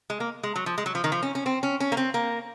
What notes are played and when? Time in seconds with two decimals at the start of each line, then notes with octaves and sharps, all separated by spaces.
0.10 G#3
0.20 A#3
0.43 G#3
0.56 F#3
0.66 F3
0.78 G#3
0.86 F#3
0.95 F3
1.04 D#3
1.12 F3
1.22 C#4
1.35 C#4
1.46 C4
1.63 C#4
1.80 C#4
1.92 A#3
1.97 C4
2.14 A#3